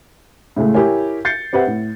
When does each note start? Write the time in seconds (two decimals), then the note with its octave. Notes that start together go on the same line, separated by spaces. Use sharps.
0.56 A2 C#3 G#3 A3
0.74 E4 G4 A#4 C#5 G#5
1.25 G6 A6 C7 C#7
1.53 C4 G4 B4 E5 F#5
1.67 A2